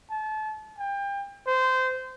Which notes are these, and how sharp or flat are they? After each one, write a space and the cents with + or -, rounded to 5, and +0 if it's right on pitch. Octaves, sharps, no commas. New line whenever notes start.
A5 -30
G5 +30
C5 -20